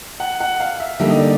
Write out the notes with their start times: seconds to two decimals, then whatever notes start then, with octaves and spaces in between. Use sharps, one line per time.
0.20 F#5
0.40 F#5
0.60 F5
0.80 E5
0.99 D3 G3 A#3 D#4 G4 E5
1.10 D#5
1.19 D5